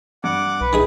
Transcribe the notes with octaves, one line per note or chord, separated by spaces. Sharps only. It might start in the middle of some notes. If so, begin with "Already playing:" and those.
G2 F#5 D6
B1 B4
D#3 D#4 E4 G#4 D#6